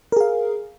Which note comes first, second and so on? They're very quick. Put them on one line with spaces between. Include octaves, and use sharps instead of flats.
A#4 G#4 F5